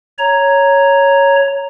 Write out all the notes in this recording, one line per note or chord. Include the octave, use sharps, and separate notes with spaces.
C#5 A#5